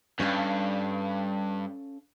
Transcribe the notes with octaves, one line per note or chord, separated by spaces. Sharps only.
G2 C#4 A4 F5